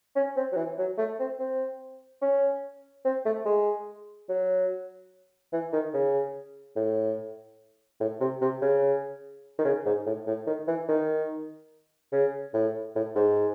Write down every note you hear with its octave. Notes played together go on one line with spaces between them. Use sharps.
C#4
C4
F#3
E3
F#3
A3
C4
C4
C#4
C4
A3
G#3
F#3
E3
D#3
C#3
A2
A2
C3
C3
C#3
D#3
C#3
G#2
A2
A2
D#3
E3
D#3
C#3
A2
A2
G#2